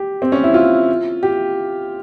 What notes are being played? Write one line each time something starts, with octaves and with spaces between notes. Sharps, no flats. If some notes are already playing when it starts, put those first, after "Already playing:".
Already playing: G4
C4
C#4
E4
F4
G4